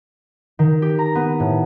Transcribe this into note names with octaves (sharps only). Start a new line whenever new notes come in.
D#3
G4
A#5
B3
A2